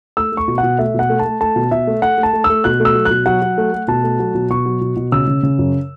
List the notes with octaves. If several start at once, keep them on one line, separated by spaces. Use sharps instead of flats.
A3 E6
A3
C#6
B2
F#5
B2
A3 E5
B2 F#5
A3
A5
A3
A3 A5
B2
B2 E5
A3
A3 F#5
A3
A5
A3
E6
A3
B2 F#6
A3
E6
F#3
B2 F#6
F#3 F#5
F#3
A3
A3
B2 A5
A3
F#3
B2
B2 C#6
F#3
B2
B2
C#3 E6
C#3
C#3
F#2